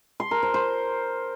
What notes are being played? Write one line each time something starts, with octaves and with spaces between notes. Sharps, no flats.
C6
A#4
C5
C5